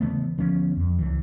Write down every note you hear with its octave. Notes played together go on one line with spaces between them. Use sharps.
C#3 E3 A3 B3
D2 F3 B3 C#4
F2
C#2 E3